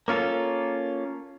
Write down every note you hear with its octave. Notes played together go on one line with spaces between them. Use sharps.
A#3 C#4 F4 A4